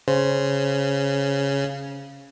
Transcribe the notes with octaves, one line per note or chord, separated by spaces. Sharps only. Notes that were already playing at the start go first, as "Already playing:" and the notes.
C#3 C5